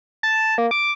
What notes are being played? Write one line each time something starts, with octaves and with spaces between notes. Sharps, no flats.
A5
A#3
D6